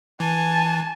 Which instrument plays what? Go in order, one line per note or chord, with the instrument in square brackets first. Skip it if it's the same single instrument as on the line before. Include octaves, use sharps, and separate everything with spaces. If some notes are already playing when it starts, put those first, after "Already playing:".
[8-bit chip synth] E3 [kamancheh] G#5 A5